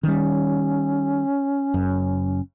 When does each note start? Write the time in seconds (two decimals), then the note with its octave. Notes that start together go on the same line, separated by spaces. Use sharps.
0.03 D#3 G3 C#4
1.74 F#1 F#2